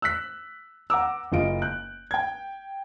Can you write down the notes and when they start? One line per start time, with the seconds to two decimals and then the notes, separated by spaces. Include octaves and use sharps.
0.02 E6 F#6 B6
0.90 F#5 A#5 D6 E6
1.32 F#1 F4 D#5 D7
1.62 F#6 G6
2.11 G5 G#6